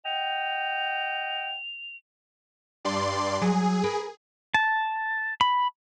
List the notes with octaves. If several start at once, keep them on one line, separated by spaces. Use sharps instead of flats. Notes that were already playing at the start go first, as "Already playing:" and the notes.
D#5 F#5 G5 F7
G2 D5 C6
F#3 G#4
A#4 B4
A5
B5